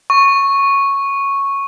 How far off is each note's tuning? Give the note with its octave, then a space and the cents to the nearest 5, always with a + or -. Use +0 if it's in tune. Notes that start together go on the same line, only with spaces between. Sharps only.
C#6 -5